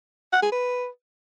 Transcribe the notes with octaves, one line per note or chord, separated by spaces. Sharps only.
F#5
G#4
B4